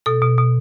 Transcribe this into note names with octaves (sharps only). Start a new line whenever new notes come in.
B2 A4
B2
B2